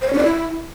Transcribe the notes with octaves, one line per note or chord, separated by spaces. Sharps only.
C5
C#5
C#4
D5
E4